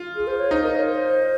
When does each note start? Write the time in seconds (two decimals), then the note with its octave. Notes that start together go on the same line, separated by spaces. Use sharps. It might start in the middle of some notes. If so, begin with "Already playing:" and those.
Already playing: F4
0.16 G#4
0.27 C5
0.39 C#5
0.51 D#4 C5
0.63 A#4
0.75 C#5
0.87 C5